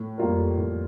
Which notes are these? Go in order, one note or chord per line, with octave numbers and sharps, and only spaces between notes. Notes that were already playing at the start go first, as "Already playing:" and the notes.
Already playing: A2
F2 G3 A#3 F4 A#4
F2 A2